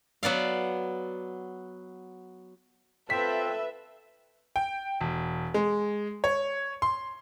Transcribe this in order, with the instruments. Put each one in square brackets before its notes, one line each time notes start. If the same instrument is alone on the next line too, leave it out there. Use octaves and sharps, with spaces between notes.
[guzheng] F#3 B3 D5 F5
[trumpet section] C4 F4 G5 [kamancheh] A4 [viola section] B4 E5 [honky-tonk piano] B6
[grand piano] G5
E1
G#3
C#5
C6